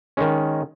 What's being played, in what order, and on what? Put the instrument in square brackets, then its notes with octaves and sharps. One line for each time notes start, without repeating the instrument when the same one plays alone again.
[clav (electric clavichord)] D#3 G#3 C#4